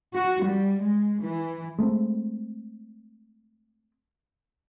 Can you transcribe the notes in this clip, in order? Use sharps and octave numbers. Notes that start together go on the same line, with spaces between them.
F#4
G3
G#3
E3
G#3 A3 B3 C4